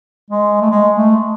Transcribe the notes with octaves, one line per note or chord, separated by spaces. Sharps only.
G#3
A3
G#3
A3